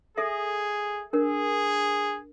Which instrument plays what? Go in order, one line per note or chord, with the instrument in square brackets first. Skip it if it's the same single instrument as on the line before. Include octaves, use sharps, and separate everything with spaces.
[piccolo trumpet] G#4 [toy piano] A4 E5
[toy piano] D4 A#4 [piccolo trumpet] G#4